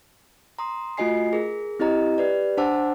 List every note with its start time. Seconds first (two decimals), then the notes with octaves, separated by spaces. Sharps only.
0.59 A#5 C6 D#6
0.97 A3 F4 F#4 D#5 G#5 C7
1.33 G#4 A#4
1.80 C4 E4 G4 D#5 A#5
2.18 G4 B4 D5
2.57 D4 C5 F#5 A5 D6 E6